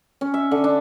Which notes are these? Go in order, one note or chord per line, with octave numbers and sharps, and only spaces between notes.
C#4
E5
D3
D4